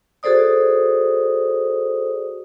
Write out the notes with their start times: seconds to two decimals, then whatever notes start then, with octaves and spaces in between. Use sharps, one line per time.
0.23 F#4 G#4 A4 C5 D5 D#6